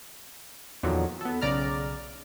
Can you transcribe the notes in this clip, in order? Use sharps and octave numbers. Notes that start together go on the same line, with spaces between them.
E2 A#2 D3 D#3 F3 F#3
B3 A4
B1 C#3 D5 A#5 F6